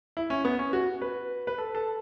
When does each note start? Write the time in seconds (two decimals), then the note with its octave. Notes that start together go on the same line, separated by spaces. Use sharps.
0.17 E4
0.30 C#4
0.45 B3
0.59 C#4
0.73 F#4
1.01 B4
1.47 B4
1.58 A4
1.75 A4